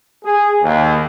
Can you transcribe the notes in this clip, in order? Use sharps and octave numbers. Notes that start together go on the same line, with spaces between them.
G#4
D#2